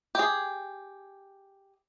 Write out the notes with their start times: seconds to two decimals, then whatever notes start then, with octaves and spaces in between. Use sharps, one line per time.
0.15 G4 G#4